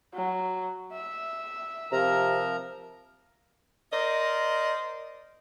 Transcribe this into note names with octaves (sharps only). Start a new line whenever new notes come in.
F#3
E5
C3 F3 A#4 A#5
A#4 C5 D5 D#5